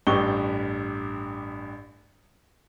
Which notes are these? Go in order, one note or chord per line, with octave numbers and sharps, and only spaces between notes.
A1 G2 G4 C#6 G7